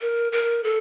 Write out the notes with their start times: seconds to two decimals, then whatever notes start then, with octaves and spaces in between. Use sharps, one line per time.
0.01 A#4
0.32 A#4
0.64 A4